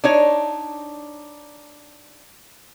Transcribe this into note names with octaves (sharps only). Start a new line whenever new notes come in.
D4 D#4 C#5